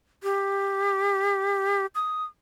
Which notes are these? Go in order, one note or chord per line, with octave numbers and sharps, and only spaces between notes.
G4
D#6